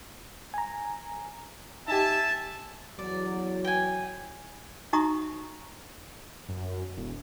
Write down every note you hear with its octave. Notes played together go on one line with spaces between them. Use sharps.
G#5 A#5
D#4 G4 E5 G#5 A5
E2 F#3 D5
G5 G#5
D#4 F#4 E5 A#5 C#6 D#6
F#2
E1